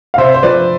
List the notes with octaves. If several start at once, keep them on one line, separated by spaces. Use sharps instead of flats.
F5
C3 C5 E5
C5
F3 B4 D5